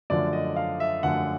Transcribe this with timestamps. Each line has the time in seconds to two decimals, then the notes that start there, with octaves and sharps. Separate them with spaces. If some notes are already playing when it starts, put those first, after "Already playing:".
0.10 F#2 D3 F3 A3 D5
0.33 D#5
0.56 F5
0.80 E5
1.03 F#2 D3 F3 A3 F#5